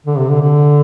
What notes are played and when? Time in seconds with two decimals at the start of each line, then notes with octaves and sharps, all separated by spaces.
0.06 D3
0.18 C3
0.30 D3
0.42 D3